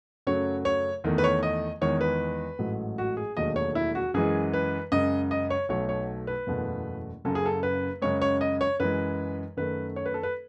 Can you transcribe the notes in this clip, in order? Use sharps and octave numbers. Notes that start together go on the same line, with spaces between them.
F#2 C#3 F#3 A3 C#5
C#5
E2 D#3 A3
B4
C#5
D#5
E2 D#3 G#3 C#5
B4
A1 G#2 F#3 A3
F#4
G#4
E1 D#2 D#3 F#3 A3 D#5
C#5
E4
F#4
F#2 E3 G#3 G#4
B4
F#2 C#3 G#3 D#5
D#5
C#5
B1 B2 F#3 A3 C#5
C#5
B4
F#1 E2 B2 A3
F#1 F#2 C#3 A4
G#4
A4
B4
F#2 C#3 G#3 C#5
C#5
D#5
C#5
F#2 E3 G#3 B4
F#2 D#3 A3 B4
C#5
B4
A4
B4